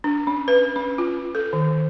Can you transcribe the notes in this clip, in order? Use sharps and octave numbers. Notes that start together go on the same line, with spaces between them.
D4
C#4
B4
C#4
F4
A4
D#3